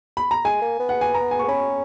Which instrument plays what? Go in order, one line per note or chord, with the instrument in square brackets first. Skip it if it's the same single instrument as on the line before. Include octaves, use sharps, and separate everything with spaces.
[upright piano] B5
A#5
[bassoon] G#3 [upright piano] G#5
[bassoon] A#3
B3
[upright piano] F#5
G#5
A#5
G#5
C#6
[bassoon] B3
[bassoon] C#4 [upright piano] B5